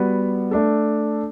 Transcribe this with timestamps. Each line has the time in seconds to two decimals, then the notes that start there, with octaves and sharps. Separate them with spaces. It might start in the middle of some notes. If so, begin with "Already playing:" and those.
Already playing: G3 B3 F#4 B4
0.51 A3 D4 A4